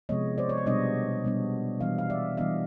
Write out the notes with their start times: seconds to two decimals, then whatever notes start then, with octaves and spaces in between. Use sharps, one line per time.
0.09 C3 F3 G#3 B3 C#5 D#5
0.38 C5 D5
0.49 C#5
0.58 D5
0.66 B2 G3 B3 D4 C#5 D#5
1.24 B2 G3 B3 D4
1.80 E3 G3 B3 D4 D#5 F5
1.98 F5
2.10 D5 E5
2.37 E3 G3 B3 D4 D#5 F5